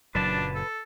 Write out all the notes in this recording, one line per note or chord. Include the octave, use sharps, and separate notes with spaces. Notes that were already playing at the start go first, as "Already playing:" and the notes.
F#1 A#2 F#3 D4 B4 A5
A4